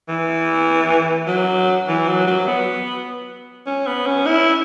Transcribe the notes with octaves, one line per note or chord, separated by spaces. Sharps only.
E3
F#3
E3
F#3
F#3
B3
C#4
B3
C#4
E4